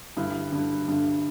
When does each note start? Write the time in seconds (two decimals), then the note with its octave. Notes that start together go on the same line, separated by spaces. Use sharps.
0.17 G2 D3 E4
0.52 G2 D3
0.88 G2 D3